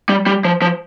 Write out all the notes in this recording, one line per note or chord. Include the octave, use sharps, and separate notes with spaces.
G3
G3
F3
F3